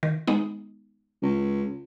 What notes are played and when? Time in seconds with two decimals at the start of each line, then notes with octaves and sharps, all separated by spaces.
0.03 D#3
0.27 G#3 B3 D#4
1.22 C#2